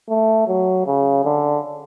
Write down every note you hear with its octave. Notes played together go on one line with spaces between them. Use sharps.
A3
F#3
C#3
D3